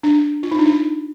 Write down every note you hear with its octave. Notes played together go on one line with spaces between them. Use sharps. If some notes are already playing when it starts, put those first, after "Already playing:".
D4
F4
D#4
D4
D#4